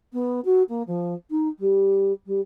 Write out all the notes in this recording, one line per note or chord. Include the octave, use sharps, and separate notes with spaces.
B3
F#4
A#3
F3
D#4
G3
G3